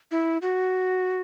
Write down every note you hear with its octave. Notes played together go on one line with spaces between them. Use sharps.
E4
F#4